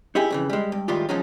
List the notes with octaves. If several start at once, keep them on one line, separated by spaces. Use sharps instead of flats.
D#4 E4 G4 G#4
F2 C#3 E3
G3 G#3
G2
A2 D#3 G3 G#3 F4 G4
F3 F#3 G#3 C#4 D#4